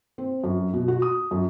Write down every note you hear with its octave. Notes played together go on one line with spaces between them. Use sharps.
C4
F#2
B2
F#4
D#6
F#2